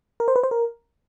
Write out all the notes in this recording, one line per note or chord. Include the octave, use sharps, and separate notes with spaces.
A#4
C5
B4
C5
A#4